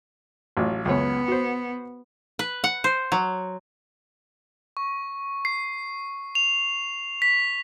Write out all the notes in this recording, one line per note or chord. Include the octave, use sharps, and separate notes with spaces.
A1 F#3 F4
C#2 F#2 B3 C#5
F#4 C5
B4
F#5
C5
F#3
C#6
C7
F7
B6